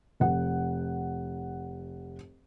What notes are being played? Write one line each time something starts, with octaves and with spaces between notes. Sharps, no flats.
F1 F#5